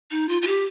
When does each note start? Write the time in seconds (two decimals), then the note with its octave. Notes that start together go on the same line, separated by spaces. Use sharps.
0.11 D#4
0.29 F4
0.42 F4
0.47 G4